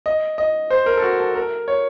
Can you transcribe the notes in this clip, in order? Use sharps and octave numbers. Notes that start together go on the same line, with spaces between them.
D#5
D#5
C5
A#4
A4
F#4
A4
A#4
C#5